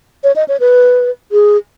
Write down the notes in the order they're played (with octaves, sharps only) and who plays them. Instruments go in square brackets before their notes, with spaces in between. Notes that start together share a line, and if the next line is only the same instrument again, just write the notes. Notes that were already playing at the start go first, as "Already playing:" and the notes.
[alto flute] C#5
D#5
C#5
B4
G#4